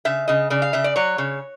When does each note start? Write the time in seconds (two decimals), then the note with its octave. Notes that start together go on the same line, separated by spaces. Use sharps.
0.05 C#3 E5
0.28 C#3 D#5
0.50 C#3 D5
0.62 F5
0.73 C#3 E5
0.84 D5
0.96 F#3 C#5
1.18 C#3